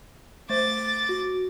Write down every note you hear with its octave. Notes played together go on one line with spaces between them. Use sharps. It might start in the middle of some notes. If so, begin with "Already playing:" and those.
A3 C5 D6 A6
F#4